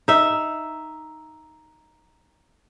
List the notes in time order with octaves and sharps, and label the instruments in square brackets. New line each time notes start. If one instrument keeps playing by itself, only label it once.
[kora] D#4 E5